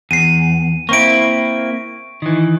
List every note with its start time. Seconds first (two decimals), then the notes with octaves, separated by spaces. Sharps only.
0.11 E2 C7 D#7
0.89 A#3 C4 E4 C#6 D7
2.22 D#3 E3